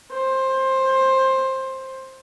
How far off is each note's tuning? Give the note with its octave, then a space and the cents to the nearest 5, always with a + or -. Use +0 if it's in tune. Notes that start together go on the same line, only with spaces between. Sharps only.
C5 +15